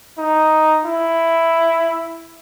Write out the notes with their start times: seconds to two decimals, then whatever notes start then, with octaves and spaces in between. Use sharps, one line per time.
0.18 D#4
0.85 E4